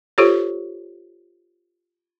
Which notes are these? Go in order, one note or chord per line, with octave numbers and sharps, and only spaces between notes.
F4 G4 A4 C5 C#5